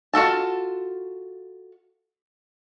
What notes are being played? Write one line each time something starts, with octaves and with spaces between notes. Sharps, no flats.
F4 F#4 A4 A5